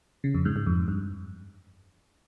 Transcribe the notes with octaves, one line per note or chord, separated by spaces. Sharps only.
C#3
F2
G#2
G#2
F2
G2